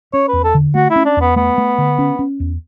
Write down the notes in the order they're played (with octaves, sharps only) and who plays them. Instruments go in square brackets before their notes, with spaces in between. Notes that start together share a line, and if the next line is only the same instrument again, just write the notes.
[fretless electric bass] C#4 [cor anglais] C#5
[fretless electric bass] E2 [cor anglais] B4
[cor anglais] A4
[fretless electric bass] D3
[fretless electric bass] A3 [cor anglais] F#4
[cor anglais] E4
[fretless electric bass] C#4
[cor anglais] D4
[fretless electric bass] E2 [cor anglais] B3
[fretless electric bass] A3 [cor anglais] B3
[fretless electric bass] A3
D3
C#4
C#4
E2